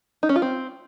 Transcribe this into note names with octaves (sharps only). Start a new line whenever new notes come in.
D#4
C#4
F4
C4